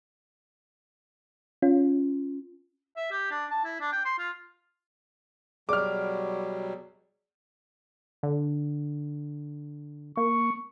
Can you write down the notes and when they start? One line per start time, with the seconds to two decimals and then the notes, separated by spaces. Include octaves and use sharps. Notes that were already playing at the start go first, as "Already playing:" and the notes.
1.62 C#4 F4
2.97 E5
3.11 G4
3.31 D4
3.50 A5
3.65 E4
3.80 D4
3.92 G5
4.05 C6
4.18 F4
5.69 B2 F#3 G3 G#4 D5 D6 F6
8.23 D3
10.17 A#3 C#6